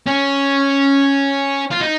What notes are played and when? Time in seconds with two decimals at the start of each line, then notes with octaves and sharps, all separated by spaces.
0.07 C#4
1.71 F4
1.81 D#4